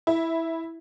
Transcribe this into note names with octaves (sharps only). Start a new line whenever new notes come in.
E4